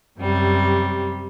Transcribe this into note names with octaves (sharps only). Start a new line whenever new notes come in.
F#2 C3 G3